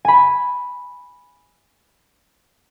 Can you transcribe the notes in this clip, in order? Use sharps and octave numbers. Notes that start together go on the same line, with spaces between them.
G#5 B5